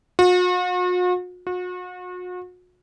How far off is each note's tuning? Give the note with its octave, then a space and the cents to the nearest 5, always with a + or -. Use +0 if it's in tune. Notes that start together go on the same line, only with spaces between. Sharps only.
F#4 -45
F#4 -40